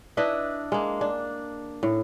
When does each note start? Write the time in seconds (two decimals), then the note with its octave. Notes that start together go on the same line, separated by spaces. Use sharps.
0.17 D4 E4 B4 D#5
0.72 G#3 A#3
1.01 D4
1.83 A2